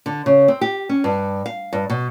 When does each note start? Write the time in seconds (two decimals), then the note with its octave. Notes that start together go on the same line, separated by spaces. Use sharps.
0.06 D3
0.26 C#3
0.48 C4
0.61 G4
0.89 C#4
1.04 G2
1.46 F5
1.73 G2
1.90 B2